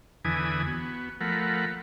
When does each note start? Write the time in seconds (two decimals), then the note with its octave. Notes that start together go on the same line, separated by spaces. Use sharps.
0.25 E2 D3 E3 B4 G#5 D#6
0.67 B3 F#4
1.21 F3 A3 A#4 F#5 B5